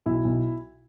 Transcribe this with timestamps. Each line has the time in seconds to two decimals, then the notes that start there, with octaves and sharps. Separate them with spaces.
0.06 B1 E4
0.24 B1